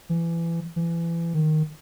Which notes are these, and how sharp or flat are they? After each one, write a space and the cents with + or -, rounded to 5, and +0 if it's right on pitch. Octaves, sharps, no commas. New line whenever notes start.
E3 +25
E3 +30
D#3 -5